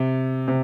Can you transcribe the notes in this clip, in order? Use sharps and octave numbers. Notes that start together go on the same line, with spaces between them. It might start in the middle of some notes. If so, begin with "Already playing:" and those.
Already playing: C3
C3